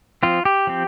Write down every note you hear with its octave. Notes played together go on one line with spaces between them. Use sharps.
F3 C4 F4
G4
F3 C4